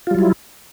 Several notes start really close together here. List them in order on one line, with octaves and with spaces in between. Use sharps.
F4 G3 F#3 E4